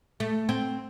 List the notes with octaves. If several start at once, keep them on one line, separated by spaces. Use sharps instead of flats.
A3
C4